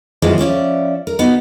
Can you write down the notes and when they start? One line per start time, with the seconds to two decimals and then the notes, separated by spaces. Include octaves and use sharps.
0.22 F#2 B2 E3 F3 G#3
0.38 F3 C#4 D5 E5
1.07 A#4
1.19 B3 D#4 F#4 B4